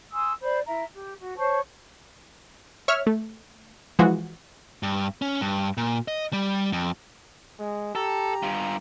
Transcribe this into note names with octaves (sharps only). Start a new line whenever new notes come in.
G#5 C6 D#6 E6
C5 D5 B5
E4 E5 A#5
G4
F#4
C5 C#5 A5 C#6
C#5 E5 F6
A3
E3 F3 G#3 F#4
G2
C#4
G2
A#2
D#5
G3
F2
G#3
G4 A4 A#5
G2 F4